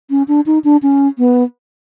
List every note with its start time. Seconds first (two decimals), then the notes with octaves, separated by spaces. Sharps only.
0.10 C#4
0.28 D4
0.46 D#4
0.64 D4
0.83 C#4
1.18 B3